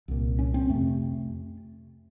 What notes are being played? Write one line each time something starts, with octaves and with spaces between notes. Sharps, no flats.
C2 A#2
C#4
C4
F2 C3 A3